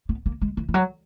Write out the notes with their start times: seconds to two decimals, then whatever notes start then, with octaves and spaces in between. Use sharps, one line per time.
0.09 B3
0.26 A#3
0.41 G#3
0.57 E3
0.69 E3
0.74 F#3